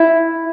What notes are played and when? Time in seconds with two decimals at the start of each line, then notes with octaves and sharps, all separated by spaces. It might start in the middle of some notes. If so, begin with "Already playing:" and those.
Already playing: E4